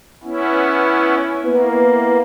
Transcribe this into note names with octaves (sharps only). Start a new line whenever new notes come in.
B3 C#4 E4
A#3 B3 E4 B4